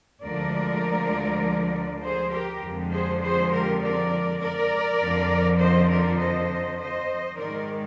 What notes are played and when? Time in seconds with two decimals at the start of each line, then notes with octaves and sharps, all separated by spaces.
0.24 D2 D3 F3 G#3 A#4 D5
2.02 G#4 C5
2.32 G4 A#4
2.62 F2 D3 F3 G#3
2.92 G#4 C5
3.21 G#4 C5
3.52 G4 A#4
3.80 A#4 D5
4.41 A#4 D5
5.00 F2 D3 F3
5.60 C5 D#5
5.89 A#4 D5
6.18 C5 D#5
6.78 C5 D#5
7.37 G#2 D#3 G#3 A#4 D5